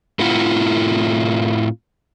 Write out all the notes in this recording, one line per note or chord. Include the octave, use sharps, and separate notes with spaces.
A2 C4 E4 F4 F#5